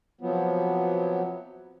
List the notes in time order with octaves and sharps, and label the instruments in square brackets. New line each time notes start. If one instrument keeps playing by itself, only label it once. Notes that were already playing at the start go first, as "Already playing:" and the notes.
[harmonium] C3 F3 F#3 B3